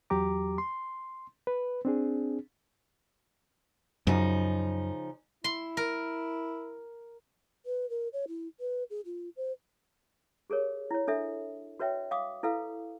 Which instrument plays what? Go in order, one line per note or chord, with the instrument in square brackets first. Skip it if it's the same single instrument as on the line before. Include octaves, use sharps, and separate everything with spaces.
[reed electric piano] E2 F#3 G4 A#5 D6
C6
B4
C4 D4 G#4
[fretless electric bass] F#2 [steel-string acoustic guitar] C#3 F3 D#4
[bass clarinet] E4 [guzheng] C6
[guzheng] A#4
[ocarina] B4
A#4
C#5
E4
B4
G#4
F4
C5
[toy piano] G4 G#4 A#4 C#5
E4 C#5
D4 A4 E5
F#4 B4 C#5 E5 G5
F5 D6 D#6
E4 A4 B4 F5